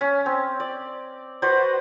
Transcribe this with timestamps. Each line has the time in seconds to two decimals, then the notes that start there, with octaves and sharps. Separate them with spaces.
0.01 C#4
0.26 C4
0.60 D5
1.42 F#4 B4 C5 D5